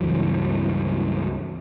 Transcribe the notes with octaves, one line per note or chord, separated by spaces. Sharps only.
C#2 G2 E3 F#3